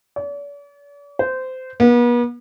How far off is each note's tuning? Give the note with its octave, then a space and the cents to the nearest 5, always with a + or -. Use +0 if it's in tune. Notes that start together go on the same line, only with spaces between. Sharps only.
D5 -45
C5 -20
B3 -40